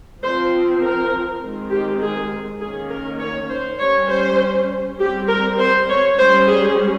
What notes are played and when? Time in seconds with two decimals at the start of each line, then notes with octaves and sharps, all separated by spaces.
0.22 F3 C4 C5
0.82 A#4
1.41 D#3 G#3 C4
1.71 G4
2.02 G#4
2.61 D#3 A#3 C#4 G#4
2.90 A#4
3.20 C#5
3.50 C5
3.80 G3 C#5
3.84 C#4
4.09 C5
4.99 G3 C4 G4
5.28 A#4
5.59 C5
5.89 C#5
6.19 G3 C#4 C5
6.48 G#4